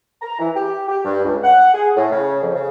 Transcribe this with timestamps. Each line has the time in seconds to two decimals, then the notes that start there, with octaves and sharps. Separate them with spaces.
0.22 A#5
0.39 E3
0.55 G4
0.88 G4
1.05 G2
1.24 C#2
1.43 F#5
1.74 G#4
1.97 A2
2.12 C#3
2.42 F2
2.55 C#3